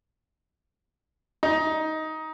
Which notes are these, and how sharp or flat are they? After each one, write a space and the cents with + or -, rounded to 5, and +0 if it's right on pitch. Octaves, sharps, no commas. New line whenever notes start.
D#4 +15